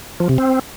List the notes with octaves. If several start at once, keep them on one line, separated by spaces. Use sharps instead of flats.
F3
C3
C4